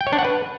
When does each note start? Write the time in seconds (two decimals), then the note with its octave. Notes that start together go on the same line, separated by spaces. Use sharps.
0.01 G5
0.07 C#5
0.13 D4
0.19 F#5
0.25 B4